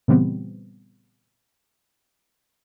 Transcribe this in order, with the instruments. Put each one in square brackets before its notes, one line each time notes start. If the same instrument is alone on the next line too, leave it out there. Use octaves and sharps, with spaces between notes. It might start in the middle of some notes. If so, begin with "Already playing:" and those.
[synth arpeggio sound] A#2 C#3 E3 G3 B3 C4